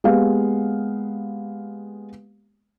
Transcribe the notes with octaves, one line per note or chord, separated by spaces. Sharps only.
G#3 A#3 B3 G4 F5